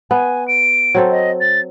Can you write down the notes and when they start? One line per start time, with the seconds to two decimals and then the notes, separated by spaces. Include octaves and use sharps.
0.11 B3 G#5
0.48 D7
0.95 F#3 C4 A4
1.11 D#5
1.41 A6